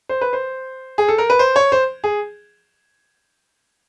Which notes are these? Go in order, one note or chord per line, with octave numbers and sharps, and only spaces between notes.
C5
B4
C5
G#4
A4
A#4
B4
C5
C#5
C5
G#4